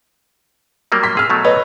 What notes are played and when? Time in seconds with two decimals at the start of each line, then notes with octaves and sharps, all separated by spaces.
0.92 F#3 G3 A#3
1.03 C6 B6
1.17 G#4 E6 F6
1.30 B2 F#3 A3
1.44 B4 C#5 D#5